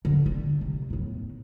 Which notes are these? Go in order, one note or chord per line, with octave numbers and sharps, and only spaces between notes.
E1 D3
F3 G3
C3
E2 A2